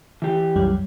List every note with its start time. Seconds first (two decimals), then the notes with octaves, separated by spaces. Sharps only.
0.22 E3 G4
0.56 C2 F#2 G3